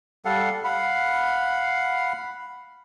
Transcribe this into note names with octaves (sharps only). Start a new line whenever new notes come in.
G3 A4 F5 F#5
F5 F#5 B5